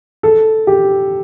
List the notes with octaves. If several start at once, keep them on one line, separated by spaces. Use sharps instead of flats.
A4
G4